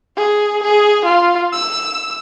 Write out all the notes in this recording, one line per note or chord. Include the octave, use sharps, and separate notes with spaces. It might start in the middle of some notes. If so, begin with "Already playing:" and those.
G#4
G#4
F4
E6